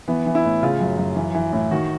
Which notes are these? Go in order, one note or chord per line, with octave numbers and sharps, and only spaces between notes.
E3 B3
E3
E4
A2
C#3 F4
F#2
F#2
E3
E3
A2
D#3 F#4